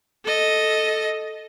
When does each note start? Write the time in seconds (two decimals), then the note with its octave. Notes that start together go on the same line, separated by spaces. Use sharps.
0.25 A4 D#5